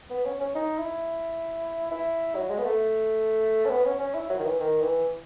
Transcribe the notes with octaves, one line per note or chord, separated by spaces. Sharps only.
B3
C#4
C#4
D#4
E4
E4
F#3
G#3
B3
A3
C#4
B3
C#4
C#4
E4
F#3
D#3
E3
D#3
E3